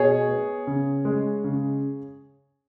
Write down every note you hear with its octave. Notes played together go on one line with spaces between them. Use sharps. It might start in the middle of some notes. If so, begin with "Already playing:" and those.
Already playing: B2 G#4 C#5
B3
C#3
G#3
C#3